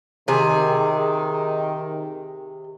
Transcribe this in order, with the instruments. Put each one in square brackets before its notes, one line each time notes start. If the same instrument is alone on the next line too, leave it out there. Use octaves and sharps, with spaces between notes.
[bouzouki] C3 G#4 [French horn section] D#3